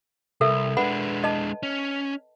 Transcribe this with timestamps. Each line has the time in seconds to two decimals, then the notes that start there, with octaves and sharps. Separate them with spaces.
0.41 C2 A4 A#4 E5
0.77 G#3 D4 B4 F#5 B5
1.24 D#5 A5
1.63 C#4